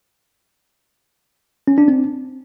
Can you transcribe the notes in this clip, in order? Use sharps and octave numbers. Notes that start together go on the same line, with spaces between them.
C#4
D4
C4